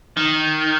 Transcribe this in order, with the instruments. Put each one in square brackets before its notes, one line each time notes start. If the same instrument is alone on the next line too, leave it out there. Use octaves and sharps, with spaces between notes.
[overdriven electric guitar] D#3